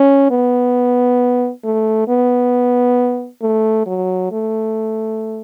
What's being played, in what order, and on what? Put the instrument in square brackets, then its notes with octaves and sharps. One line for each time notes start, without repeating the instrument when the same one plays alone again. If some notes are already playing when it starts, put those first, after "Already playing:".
Already playing: [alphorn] C#4
B3
A3
B3
A3
F#3
A3